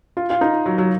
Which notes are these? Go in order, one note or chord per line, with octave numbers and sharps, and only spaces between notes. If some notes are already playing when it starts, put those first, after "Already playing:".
F4
F4
D#4
F#3
F#3